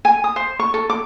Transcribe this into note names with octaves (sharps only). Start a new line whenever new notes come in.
G#5
D#6
C5
C#6
A4
D6